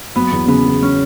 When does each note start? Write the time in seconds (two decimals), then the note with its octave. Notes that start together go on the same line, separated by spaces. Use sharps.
0.16 F#3 B3
0.32 E2
0.48 C#3 B3
0.65 C#3
0.82 C#4